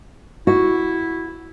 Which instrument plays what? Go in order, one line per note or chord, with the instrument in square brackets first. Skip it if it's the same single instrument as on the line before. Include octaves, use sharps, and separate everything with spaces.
[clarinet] E4 [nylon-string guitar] F#4